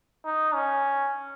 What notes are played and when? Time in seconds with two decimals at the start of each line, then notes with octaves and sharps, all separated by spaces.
0.25 D#4
0.55 C#4